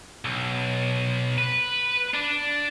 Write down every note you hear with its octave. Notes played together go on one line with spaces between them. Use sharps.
B1
B4
D4